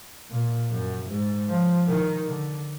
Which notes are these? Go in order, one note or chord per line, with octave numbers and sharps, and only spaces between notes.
A#2
F#2
G#2
F3
D#3
D3